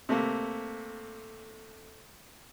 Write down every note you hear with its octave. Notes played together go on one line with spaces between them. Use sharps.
C3 A3 A#3